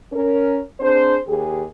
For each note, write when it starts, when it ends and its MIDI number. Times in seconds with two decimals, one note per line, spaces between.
0.13 0.60 61
0.13 0.60 70
0.80 1.17 60
0.80 1.17 62
0.80 1.17 68
0.80 1.17 72
1.27 1.65 39
1.27 1.65 67
1.27 1.65 68